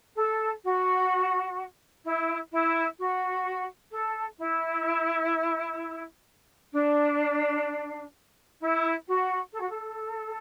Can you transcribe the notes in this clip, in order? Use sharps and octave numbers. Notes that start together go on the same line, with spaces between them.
A4
F#4
E4
E4
F#4
A4
E4
D4
E4
F#4
A4
F#4
A4